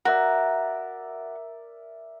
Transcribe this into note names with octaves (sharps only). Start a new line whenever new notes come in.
F#4 A#4 D5 E5